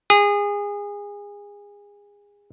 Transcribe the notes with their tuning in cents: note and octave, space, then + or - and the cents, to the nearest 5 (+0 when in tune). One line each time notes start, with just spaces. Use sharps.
G#4 -25